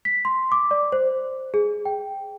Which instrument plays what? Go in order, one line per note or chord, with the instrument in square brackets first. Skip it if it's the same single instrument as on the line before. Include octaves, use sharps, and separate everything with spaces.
[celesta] B6
C6
D6
D5
C5
G#4
G5